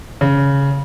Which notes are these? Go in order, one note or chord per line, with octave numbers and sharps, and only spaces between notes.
C#3